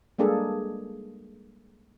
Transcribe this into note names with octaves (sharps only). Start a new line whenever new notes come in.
G3 G#3 A#3 D4 G#4 A4